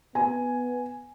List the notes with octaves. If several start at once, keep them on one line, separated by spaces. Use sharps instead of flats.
B3 G#5